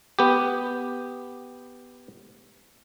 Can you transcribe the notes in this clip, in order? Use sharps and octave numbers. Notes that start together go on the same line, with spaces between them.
B3 G4